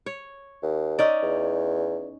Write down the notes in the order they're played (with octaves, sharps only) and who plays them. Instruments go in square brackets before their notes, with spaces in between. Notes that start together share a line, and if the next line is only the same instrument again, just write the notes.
[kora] C#5
[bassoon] D#2
[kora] C#4 D#4 D5
[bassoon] E2